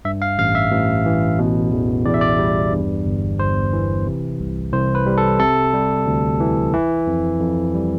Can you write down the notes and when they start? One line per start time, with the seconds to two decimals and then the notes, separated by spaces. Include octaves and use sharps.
0.05 G2 E5
0.22 F5
0.38 A1 F5
0.55 E5
0.71 A1
1.06 E3
1.39 B2
1.72 E2
2.06 E2 D5
2.14 E5
2.21 D5
2.39 G3
2.72 G2
3.06 G1
3.39 G1 C5
3.73 E3
4.06 C3
4.39 C2
4.73 C2 C5
4.95 B4
5.06 G3
5.18 A4
5.40 C3 A4
5.73 G3
6.07 D2
6.40 E3
6.74 E3
7.07 F2
7.40 F2
7.74 G3